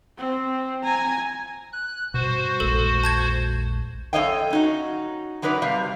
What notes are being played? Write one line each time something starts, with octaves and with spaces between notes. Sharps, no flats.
C4
G#5 A#5
F#6
G2 B2 F#4 C5
E1 A#1 G#3 A4
A5 G6 G#6
F#2 A4 C#5 D#5 F5 G5
C#4 D#4 F#4
F#2 F#3 D#4 B4 D5
C3 G3 F5